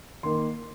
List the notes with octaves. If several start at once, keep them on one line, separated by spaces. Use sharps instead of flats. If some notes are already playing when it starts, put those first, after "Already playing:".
D#3 A#3 C6